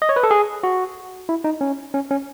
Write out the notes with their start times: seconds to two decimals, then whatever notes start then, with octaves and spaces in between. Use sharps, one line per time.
0.02 D#5
0.09 C#5
0.16 B4
0.23 A4
0.31 G#4
0.63 F#4
1.29 E4
1.44 D#4
1.61 C#4
1.94 C#4
2.11 C#4